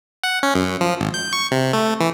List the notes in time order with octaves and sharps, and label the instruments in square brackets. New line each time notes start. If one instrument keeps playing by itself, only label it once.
[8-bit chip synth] F#5
C#4
F#2
F3
G#1
G6
C#6
C3
A3
E3